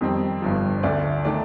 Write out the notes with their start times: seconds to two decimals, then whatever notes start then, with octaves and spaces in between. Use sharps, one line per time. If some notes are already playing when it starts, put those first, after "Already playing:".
0.01 F2 D#3 G3 C4
0.42 G1 G2 F3
0.78 C5
0.83 D2 D3 A3 D5
1.25 D#3 A3 D4 D5